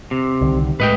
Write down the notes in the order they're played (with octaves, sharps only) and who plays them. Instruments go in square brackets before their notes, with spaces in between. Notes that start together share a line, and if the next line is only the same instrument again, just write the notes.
[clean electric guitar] C3
[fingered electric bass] C2 D3 D#3
[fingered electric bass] A2 G#3 A3 [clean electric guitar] B4 D#5 G5